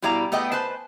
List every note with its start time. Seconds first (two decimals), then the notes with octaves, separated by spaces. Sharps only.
0.02 B2 G3 E4 D5 F5 A#5
0.32 A3 B3 D5 D#5 G5
0.52 B4 C5 G#5 A5